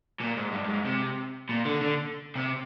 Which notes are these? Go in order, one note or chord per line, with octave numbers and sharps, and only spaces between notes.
A#2
G#2
G2
G2
G#2
C3
A#2
D3
D3
C3